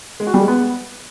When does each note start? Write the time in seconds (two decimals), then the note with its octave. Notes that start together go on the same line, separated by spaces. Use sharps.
0.20 G#3
0.27 F#4
0.34 G3
0.41 G#3
0.48 B3